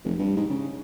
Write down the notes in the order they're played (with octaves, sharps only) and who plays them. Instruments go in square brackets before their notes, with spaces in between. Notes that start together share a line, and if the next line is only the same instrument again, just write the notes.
[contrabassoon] F1
G2
G#2
C#3